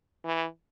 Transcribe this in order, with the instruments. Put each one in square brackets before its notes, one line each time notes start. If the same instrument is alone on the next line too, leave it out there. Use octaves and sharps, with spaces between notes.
[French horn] E3